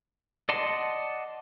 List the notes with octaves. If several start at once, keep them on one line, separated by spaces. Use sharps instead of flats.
D5 D#5 F#5 A5 C6